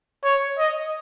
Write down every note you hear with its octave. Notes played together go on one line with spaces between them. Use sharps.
C#5
D#5